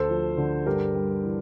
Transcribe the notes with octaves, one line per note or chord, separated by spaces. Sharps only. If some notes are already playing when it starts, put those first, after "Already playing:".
Already playing: D2 A4 C5
F3
D3
G2 G4 A#4
G3
E3